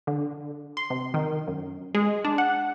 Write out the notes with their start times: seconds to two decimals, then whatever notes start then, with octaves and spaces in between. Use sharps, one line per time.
0.07 D3
0.77 C6
0.90 C3
1.14 D#3
1.47 F#2
1.94 G#3
2.24 D4
2.38 F#5